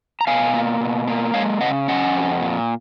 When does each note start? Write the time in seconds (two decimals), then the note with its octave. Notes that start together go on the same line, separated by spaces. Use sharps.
0.21 A#5
0.27 B2 F5 G#5
0.54 A#3
0.81 B2
1.08 A#3
1.34 G#3 C#5 F5
1.61 C#3 D#5 F#5
1.88 C#4 D#5 F#5
2.15 F2
2.41 A#2